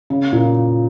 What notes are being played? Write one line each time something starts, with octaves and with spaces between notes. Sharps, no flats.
C#3
A#2